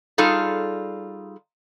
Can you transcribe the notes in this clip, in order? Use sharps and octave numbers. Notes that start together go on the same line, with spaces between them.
G3 D#4 F4 G#4 A4